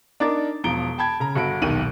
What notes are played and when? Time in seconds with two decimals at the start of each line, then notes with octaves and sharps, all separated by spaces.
0.20 D4 D#4 A#4 D6 A6
0.64 E1 F3 A#5 D7 G7
0.98 G5 A5 B5 G#6
1.20 C#3 A#5
1.35 G1 F#4 A4 B5 D7
1.62 D#1 B1 D#3 G4 D#7 F#7